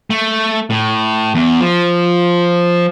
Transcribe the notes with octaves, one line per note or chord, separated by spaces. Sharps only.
A3
A2
E2
F3